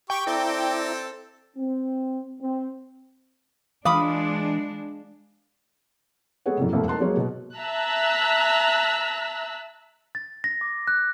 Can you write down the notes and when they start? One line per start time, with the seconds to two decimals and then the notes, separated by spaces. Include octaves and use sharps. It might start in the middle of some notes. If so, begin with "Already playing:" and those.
0.10 G4 G5 C#6
0.27 C4 E4 A4 D5 A#5
1.57 C4
2.40 C4
3.85 E3 G#3 D4 F5 B5 D6 D#6
6.46 G#3 B3 G#4 A4 C#5 F#5
6.57 F#2 A2 C3
6.72 E1 C2 F2 A3 A#3
6.88 D#4 A#4 A5 C6 F#6
7.00 F#3 G#3 A#3 B3 G#4 C#5
7.17 B2
7.57 E5 A5 A#5 E6 F#6
10.15 A6
10.44 A#6
10.61 D6
10.87 F#6